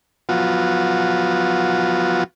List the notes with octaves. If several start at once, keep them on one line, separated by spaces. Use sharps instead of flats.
F3 F#3 B3 F4 F#4